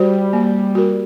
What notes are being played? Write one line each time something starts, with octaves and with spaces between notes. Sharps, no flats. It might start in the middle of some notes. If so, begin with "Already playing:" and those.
Already playing: G3 F#4 C5
A#3
F#4 A#4